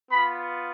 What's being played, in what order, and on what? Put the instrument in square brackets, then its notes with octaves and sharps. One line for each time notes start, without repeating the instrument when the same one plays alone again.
[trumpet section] B3 F4 B5